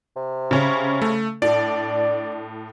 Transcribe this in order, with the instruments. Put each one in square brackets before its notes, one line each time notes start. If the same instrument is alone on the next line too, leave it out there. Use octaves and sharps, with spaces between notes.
[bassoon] C3
[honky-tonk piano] C#3 C#4
[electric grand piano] A3
[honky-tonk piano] A2 [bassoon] D4 [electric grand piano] D5